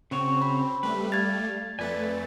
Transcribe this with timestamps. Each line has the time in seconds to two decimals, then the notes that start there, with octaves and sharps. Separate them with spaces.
0.11 C#3 C4 F#4 C#5
0.42 B5
0.83 G3 A3 B4
1.12 F5 G#6 A6
1.79 F2 A3 B4 D5 G#5 A6